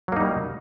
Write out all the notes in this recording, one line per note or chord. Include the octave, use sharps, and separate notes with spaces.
F#3 G3 A#3 D#4